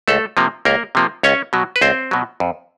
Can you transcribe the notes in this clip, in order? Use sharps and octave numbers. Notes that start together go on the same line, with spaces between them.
C#2 A3 A4
C3 F3 A#3
C#2 A#3 A#4
C3 F3 A#3
C#2 C#4 C#5
B2 F#3
B4
C#2 C4 C5
B2 F#3
F2